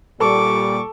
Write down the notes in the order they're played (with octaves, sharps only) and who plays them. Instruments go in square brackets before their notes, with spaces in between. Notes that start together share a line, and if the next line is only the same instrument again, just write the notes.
[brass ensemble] A#2 G3 [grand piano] A4 [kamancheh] C#6 D6